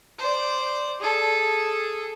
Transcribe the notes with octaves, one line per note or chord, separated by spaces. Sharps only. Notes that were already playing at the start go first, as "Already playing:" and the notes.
C5 D5
G#4 A4